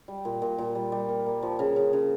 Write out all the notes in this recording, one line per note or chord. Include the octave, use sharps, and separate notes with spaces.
G3
A#2
A#2
A#2
G3
G3
A#3
A#3
F3
C#3
C#3
C#3